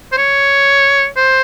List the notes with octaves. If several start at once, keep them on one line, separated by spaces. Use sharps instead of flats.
C5
C#5
C5